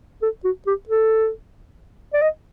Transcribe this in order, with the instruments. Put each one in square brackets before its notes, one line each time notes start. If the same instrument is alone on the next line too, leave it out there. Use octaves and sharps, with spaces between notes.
[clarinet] A4
F#4
G4
A4
D5
D#5